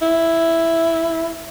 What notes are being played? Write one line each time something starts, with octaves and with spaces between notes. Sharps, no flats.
E4